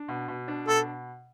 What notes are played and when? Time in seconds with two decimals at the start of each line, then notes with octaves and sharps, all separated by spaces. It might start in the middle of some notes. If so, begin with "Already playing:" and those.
Already playing: D4
0.08 B2
0.28 B2
0.48 D4
0.67 B2 A4